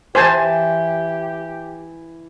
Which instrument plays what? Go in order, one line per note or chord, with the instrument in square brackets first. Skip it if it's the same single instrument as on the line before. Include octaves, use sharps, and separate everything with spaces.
[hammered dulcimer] E3 [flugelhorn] G4 [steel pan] C5 G#5 A5